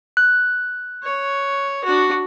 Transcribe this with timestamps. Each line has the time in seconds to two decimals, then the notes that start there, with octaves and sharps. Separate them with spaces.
0.17 F#6
1.03 C#5
1.85 D4 F#4